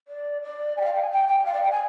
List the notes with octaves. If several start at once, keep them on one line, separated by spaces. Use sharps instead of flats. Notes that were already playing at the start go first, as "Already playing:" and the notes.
D5
D5
G#5
G5
F5
G5
G#5
G5
G5
F5
D5
G5
G#5